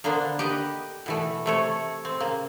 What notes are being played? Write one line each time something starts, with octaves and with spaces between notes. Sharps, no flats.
D3 A#3 B3 D4 C5
G4 B4 D#5
B2 E3 A3
C3 A3 C#5
C4
C#3 A#3